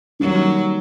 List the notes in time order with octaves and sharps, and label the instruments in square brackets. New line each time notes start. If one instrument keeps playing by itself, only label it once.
[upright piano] D#3 G3 A#3 [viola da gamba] F#3